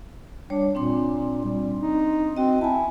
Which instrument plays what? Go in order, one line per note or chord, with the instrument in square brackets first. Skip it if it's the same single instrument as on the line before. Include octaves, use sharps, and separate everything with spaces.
[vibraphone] G3 C#5 [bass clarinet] D4
[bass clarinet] A#2 [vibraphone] C4 D4 C6
[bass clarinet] G3
D#4
[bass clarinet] C4 [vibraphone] F#4 D#5
[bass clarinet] E4 [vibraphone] G#5 A5